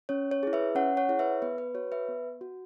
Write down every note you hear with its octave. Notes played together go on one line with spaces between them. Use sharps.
C#4 C#5
C#5
E4 G#4
B4 E5
C#4 C#5 F#5
C#5 F#5
E4 G#4 C#5
B4 E5
B3 B4
B4
F#4 C#5
B4 E5
B3
F#4